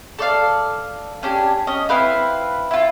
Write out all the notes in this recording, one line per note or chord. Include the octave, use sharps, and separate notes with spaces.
A4 D5 F5
C#4 D4 G4 G#5
C#4 D#5
C4 E4 B4 F5
E4 F4